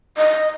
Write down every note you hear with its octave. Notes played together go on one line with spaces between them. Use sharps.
D#5